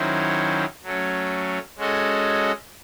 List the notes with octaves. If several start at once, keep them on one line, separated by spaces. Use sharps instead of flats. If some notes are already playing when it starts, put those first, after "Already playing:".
Already playing: D#3 F#3 C#4 E4 C5
F#3 A3 C#4
G#3 C#4 F#4 A4 D#5